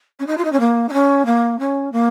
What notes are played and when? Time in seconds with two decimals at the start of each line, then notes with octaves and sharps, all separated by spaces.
0.19 C#4
0.27 D#4
0.37 F4
0.44 D#4
0.52 C#4
0.60 A#3
0.89 D#4
0.93 C#4
1.26 A#3
1.59 C#4
1.92 A#3